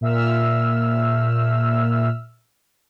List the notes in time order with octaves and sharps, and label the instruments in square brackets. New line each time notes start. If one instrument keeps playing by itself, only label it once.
[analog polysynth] A#2 E5 E6 F6